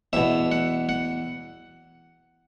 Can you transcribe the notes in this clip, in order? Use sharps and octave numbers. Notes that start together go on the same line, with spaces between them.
E2 B2 E5
F#5
F#5